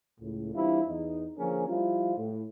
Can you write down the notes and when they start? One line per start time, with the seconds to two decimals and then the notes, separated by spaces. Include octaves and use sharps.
0.20 C#2 A2
0.54 E3 G3 C4 D4 E4 F4
0.88 E2 D#4
1.38 D3 F3 A#3 C#4 G#4 A#4
1.68 F3 G3 E4 F4
2.17 A2